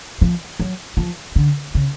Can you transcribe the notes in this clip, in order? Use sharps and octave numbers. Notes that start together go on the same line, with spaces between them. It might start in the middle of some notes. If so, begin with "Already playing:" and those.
F3
F#3
F3
D3
C#3